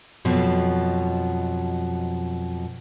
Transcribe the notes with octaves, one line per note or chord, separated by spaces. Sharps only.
F2 B2 F3 F#3